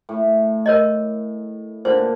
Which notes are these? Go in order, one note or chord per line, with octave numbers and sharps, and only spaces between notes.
A2
A#4 C#5 D#5
A#2 D3 C5